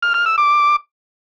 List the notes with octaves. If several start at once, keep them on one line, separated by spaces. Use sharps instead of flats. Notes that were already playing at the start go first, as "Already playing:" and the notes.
F6
F6
E6
D6